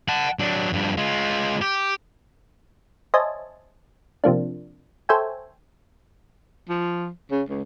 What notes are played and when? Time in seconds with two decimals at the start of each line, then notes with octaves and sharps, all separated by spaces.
0.08 F#5 A5
0.39 F#3 D4
0.73 G2 F3
0.97 G#3 F4
1.62 G4
3.14 C5 C#5 D#5 E5 G#5 A5
4.24 C3 F3 A#3 D4
5.09 A4 C5 C#5 E5 G5 G#5
6.69 F3
7.31 C#3
7.49 C#2